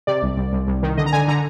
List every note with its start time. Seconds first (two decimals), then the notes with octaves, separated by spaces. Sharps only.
0.07 C3 D5
0.23 C2
0.37 C2
0.53 C2
0.68 C2
0.83 D#3
0.97 D3 D#5
1.06 A#5
1.13 D3 G#5
1.28 D3 A#5